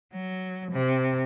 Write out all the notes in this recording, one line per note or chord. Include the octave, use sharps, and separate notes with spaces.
F#3
C3